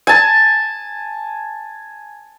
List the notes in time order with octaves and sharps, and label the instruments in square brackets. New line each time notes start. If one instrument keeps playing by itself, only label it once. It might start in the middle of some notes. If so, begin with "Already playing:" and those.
[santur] G#5 A5